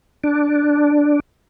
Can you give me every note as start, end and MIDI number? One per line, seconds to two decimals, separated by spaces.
0.24 1.20 62